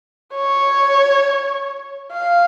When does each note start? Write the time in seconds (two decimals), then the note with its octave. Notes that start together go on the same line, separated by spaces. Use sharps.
0.34 C#5
2.12 F5